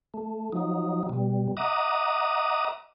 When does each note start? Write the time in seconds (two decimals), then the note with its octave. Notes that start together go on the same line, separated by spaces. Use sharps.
0.14 A3
0.52 F3 F#3 D#4
1.09 B2 G3
1.57 D#5 E5 F#5 A#5 D6 D#6